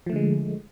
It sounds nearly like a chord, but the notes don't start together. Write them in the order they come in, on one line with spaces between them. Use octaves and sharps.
F3 A3 D3 G#3